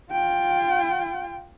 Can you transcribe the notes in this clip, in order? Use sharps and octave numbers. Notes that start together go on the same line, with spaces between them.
F4 G5